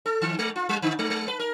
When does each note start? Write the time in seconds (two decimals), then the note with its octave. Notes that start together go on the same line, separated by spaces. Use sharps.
0.06 A4
0.22 D#3
0.39 G#3
0.56 F4
0.69 G3
0.82 D3
0.99 G#3
1.10 G#3
1.28 B4
1.40 A#4